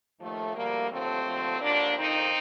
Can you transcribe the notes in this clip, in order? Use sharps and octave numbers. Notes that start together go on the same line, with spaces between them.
D#2 D#3 F3 A3
D2 D3 F3 G3 A#3
D#2 D3 F3 A3 C4
D#2 D3 F3
D#2 D3 F3 A#3 D4
F2 D#3 C4 D#4